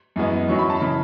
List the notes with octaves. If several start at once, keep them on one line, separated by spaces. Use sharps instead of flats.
F#2 E3 G#3 B3
F#2 D#3 F#3 C#4 C#6
B5
A5
C#3 E3 B5